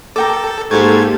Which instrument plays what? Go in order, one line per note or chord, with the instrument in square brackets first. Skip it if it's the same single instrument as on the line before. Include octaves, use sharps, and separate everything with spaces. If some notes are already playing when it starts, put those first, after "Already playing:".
[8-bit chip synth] A4 [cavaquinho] A#4 G5 D6
[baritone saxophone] G#2 [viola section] A#3 G4 A4 [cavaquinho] C6 C#6 [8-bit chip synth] G#6